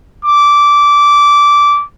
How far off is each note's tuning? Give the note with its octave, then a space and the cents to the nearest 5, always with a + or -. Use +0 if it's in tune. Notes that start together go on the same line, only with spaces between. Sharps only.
D6 -15